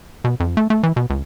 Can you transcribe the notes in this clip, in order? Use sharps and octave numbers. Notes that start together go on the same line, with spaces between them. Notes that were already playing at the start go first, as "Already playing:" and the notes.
B2
F2
A3
A3
E3
B2
C#2